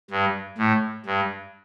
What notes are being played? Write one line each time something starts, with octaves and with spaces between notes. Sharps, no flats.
G2
A2
G2